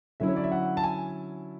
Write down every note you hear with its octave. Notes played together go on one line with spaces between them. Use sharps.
D3 F#3 C#4 E4 E5
C#5
D5
E5
F#5
A5
G#5